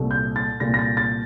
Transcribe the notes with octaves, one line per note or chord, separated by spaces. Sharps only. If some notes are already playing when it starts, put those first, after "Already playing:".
Already playing: C2 A#2 A3
G6
A6
C2 A#2 A3 A#6
A#6
A6
A6